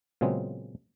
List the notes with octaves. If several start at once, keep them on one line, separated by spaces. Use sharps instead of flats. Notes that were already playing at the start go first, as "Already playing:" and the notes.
A#2 C#3 F#3 G#3 B3 C4